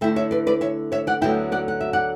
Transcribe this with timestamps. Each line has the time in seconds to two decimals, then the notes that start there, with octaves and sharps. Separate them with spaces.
0.01 D3 A3 E4 E5 G5
0.16 C#5 E5
0.31 B4 D5
0.47 B4 D5
0.61 C#5 E5
0.92 C#5 E5
1.07 D5 F#5
1.22 D2 D3 F#3 B3 E4 E5 G5
1.52 D5 F#5
1.68 F#5
1.81 E5
1.93 D5 F#5